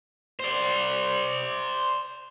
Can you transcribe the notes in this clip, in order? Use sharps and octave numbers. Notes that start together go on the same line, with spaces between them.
C5 D5